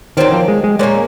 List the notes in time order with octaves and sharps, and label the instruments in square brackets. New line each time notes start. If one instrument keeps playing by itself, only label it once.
[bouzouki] A#2 F#3 C4 F4 [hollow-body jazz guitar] D#3
[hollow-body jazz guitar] F3
G#3
G#3
[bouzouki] A#2 F3 A#3 C#4 [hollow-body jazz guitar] G#3